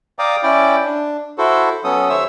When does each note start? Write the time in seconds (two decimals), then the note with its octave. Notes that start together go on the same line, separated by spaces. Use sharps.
0.19 D5 F5 G5 A#5 D6 D#6
0.43 C#4 E4 D5 G5
0.85 D4
1.38 E4 F#4 A4 C5
1.84 F#3 B3 C#4 A4 D#6
2.09 D#2 C5 C#5 E5 E6